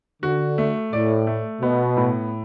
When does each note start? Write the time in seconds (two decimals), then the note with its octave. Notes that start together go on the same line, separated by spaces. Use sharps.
0.23 D3 F#4
0.58 A3
0.93 A2 D5
1.27 A3
1.61 B2 B3
1.97 A2